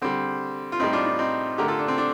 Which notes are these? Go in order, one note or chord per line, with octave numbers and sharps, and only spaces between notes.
D3 G3 C4
F4
A2 G3 C4 D#4
D4 F4
D4
C4 D#4
D3 A3 G4 A#4
F4 A4
D4
C4
D4